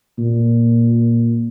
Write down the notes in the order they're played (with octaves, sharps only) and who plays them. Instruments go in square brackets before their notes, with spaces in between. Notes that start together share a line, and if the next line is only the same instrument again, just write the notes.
[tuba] A#2